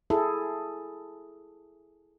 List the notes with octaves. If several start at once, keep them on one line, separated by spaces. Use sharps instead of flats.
E4 G#4 A4